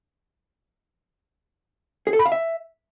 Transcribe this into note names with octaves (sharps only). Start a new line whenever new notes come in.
G#4
A4
B5
F5
E5